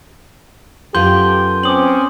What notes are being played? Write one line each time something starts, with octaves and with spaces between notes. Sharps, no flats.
F#2 B3 F4 G4 A4 C6 G6 G7
C4 C#4 D6 D#6 F#7